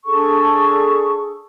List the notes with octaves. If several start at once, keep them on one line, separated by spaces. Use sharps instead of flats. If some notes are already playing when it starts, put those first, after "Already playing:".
D4 G#4 A4 C#6